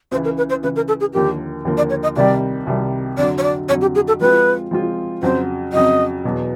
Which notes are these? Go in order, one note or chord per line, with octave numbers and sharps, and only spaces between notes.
C#2 C#3 E3 C5
A#4
B4
C5
C#2 C#3 E3 B4
A#4
A4
G#4
D#2 D3 F3 A#3 G4
D#2 D3 F3 A#3
D5
C#5
D#5
C2 C3 D#3 G3 D5
C2 C3 D#3 G3
F2 D3 F#3 D5
C#5
D5
F2 D3 F#3 C#5
G4
G#4
A4
F3 G#3 C4 F4 B4
F3 G#3 C4 F4
F2 C#3 F#3 C5
F2 C#3 F#3 D#5
E2 B2 F#3